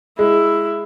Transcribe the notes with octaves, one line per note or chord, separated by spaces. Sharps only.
G#3 E4